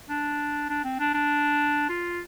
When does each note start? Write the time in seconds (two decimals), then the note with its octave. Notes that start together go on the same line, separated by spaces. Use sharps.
0.09 D4
0.69 D4
0.84 C4
0.99 D4
1.14 D4
1.89 F4